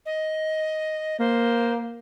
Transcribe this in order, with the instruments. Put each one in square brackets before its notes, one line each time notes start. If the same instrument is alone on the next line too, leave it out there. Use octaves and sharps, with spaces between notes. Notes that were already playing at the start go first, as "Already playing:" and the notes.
[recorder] D#5
[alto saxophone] A#3 [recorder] C5